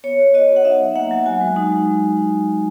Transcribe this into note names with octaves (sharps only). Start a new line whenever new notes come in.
B3 C#5
F#4
F#4 D#5
B3
F#5
D#4 E5
F#3
A#3 F#5
F#3
F#4 G#5
G#3
D#4
G#3